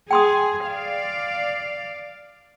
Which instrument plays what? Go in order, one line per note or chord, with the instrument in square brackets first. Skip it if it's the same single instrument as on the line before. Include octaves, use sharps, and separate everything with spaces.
[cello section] G#4 [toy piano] G5 C6 D#6
[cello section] D5 F5